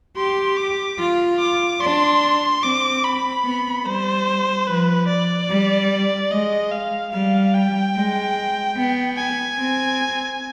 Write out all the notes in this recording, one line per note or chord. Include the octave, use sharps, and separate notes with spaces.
G4 C6
D6
F4
D6
D4 C6
C4 D6
B5
B3
G3 C5
F3 B4
D5
G3
G#3 D#5
F5
G3 F5
G5
G#3
B3
G#5
C4